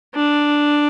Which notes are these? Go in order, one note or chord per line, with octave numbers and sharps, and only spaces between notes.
D4